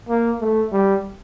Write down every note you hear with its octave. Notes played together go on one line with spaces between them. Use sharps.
A#3
A3
G3